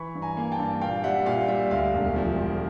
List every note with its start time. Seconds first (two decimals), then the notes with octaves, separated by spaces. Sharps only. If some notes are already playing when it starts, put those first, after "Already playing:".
Already playing: E3 B5 C#6
0.15 G2
0.22 G#5 A#5
0.37 A#3
0.52 G5 A5
0.58 G2
0.81 A#2 F5 G5
1.04 G3 E5 F#5
1.26 A#2 F5
1.48 G3 E5
1.71 D2 F5
1.94 E1
2.16 F3
2.38 D2